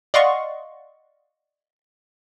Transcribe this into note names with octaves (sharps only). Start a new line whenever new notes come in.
D5 D#5 F5 F#5 C6 C#6